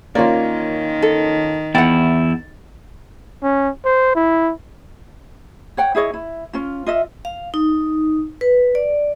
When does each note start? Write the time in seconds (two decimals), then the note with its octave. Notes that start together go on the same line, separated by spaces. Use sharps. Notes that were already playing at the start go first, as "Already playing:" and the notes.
0.15 D#3 A#3 C#4 F4 D5
1.02 A4
1.75 E2 E4 F#5 G5 A6
3.43 C#4
3.85 C5
4.16 E4
5.77 C#5 F#5 G5
5.95 E4 G#4 C#5 D#5
6.14 E4
6.53 C#4 F4
6.87 F4 D#5 E5
7.25 F5
7.54 D#4
8.41 B4
8.75 D5